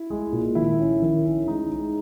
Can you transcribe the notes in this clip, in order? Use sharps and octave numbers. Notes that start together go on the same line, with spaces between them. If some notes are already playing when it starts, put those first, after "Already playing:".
Already playing: E4
G#3
A#2
D#3 E4
C#4
D#3
C#4
G#3 D#4
G#3